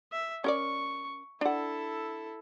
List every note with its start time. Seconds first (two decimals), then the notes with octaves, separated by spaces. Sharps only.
0.12 E5
0.44 C#4 A#4 D5 C#6
1.41 D4 E4 A4 F#5